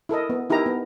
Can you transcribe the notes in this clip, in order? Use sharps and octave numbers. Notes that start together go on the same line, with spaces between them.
E4 A4 A#4 D#5
B3
D#4 E4 G4 A#4 A#5
B3